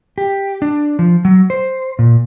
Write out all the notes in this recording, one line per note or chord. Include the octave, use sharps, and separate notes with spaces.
G4
D4
F3
F#3
C5
A#2